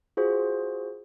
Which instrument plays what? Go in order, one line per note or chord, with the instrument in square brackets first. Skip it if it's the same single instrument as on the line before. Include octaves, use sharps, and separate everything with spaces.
[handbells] F4 F#4 G#4 C5